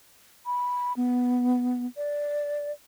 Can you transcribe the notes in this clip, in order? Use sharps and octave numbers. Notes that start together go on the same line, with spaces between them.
B5
B3
D5